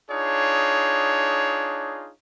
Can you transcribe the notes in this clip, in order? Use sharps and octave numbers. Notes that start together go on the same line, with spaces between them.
D4 D#4 F4 G#4 C#5